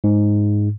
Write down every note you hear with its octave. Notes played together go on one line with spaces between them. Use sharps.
G#2